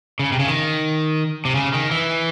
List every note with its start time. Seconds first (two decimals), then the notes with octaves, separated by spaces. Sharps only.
0.19 C#3
0.32 C3
0.39 C#3
0.47 D#3
1.45 C3
1.55 C#3
1.73 D#3
1.91 E3